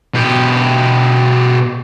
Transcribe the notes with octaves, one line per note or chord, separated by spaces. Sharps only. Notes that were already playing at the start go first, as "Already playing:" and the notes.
B2 G4